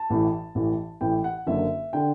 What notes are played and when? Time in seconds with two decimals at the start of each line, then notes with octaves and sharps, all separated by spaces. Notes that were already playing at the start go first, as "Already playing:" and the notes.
Already playing: A5
0.10 A1 A2 E3
0.55 A1 A2 E3
1.01 A1 A2 E3 G5
1.24 F#5
1.47 F#1 F#2 D3 E5
1.93 D3 G5